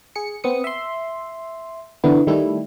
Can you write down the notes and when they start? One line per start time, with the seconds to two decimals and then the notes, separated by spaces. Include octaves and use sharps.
0.16 G#4 C#7
0.44 B3 C4 D#6 C#7
0.64 E5 C6
2.04 D3 E3 B3 E4
2.27 D#3 G3 A3 E4